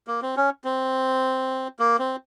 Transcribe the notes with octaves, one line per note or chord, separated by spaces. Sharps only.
A#3
C4
C#4
C4
A#3
C4